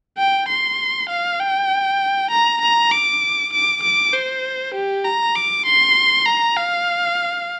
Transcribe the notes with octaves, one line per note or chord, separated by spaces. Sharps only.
G5
C6
F5
G5
A#5
A#5
D6
D6
D6
C5
G4
A#5
D6
C6
A#5
F5